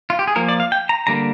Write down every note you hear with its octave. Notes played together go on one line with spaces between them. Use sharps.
F4
G4
G#4
F3 A#3 A#4
D5
F5
G5
A#5
D3 G3 A#3 A#5